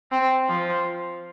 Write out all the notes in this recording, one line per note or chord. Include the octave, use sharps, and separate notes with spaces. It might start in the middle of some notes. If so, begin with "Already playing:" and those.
C4
F3